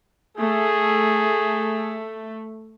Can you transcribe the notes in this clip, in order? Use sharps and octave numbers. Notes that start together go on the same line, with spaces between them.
A3 G#4